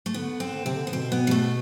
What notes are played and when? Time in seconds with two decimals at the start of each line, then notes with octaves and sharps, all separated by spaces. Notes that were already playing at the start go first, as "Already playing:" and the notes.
0.06 A3
0.14 D3 B3
0.40 C4
0.53 D3
0.65 C3 C4
0.75 D3
0.87 B3
0.93 B2 C4
1.12 B3
1.27 G3
1.31 A3